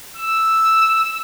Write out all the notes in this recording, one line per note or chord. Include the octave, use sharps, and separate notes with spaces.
E6